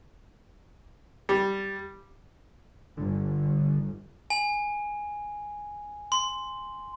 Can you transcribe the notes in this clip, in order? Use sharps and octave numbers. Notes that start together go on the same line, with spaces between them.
G3
G1 D3
G#5
C6